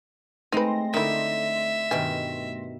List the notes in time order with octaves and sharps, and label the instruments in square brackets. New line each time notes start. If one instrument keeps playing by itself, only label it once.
[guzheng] G#3 C4 [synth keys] A3 C6 A#6 [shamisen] D#4 B4
[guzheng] D3 D#4 [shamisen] D#3 E4 [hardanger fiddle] E5
[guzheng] G2 B2 D#3 [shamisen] G#5